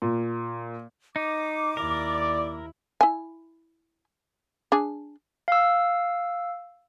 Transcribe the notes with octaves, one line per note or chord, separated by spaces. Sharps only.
A#2
D#4 D6
D#2 E4 A#4 D5
E4 G#5
D4 G#4
F5 E6